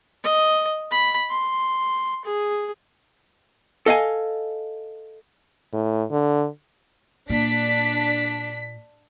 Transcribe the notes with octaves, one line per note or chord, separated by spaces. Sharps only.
D#5
B5
C6
G#4
A4 D#5 F5 G#5
A2
D3
A#2 D4 B6